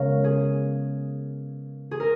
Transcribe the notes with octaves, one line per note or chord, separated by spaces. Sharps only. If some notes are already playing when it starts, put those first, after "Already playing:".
Already playing: C#3 G#3 B3 A#4 C#5 F5
G#4
G#4
A#4